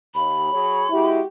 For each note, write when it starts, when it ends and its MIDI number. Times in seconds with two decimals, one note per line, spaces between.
0.15 0.51 39
0.15 1.11 83
0.52 0.86 54
0.52 0.86 68
0.52 0.86 73
0.91 1.23 56
0.91 1.20 64
0.91 1.23 66
0.91 1.23 67